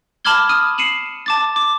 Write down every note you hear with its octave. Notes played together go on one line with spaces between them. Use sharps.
A5 B5 D6 F6 G#6 G7
D#6 F6 D#7
C7 C#7 D#7 E7 F#7
A5 D6 A6
D6